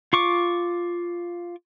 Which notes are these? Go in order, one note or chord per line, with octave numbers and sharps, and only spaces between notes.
F4 C#6 D6